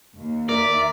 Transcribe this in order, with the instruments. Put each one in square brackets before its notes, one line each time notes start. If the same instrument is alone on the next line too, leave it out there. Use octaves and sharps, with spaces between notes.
[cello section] D#2
[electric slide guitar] A#4 [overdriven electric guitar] D5 [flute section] E5